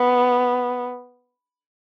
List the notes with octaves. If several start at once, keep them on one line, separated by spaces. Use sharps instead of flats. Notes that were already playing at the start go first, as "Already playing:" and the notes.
Already playing: B3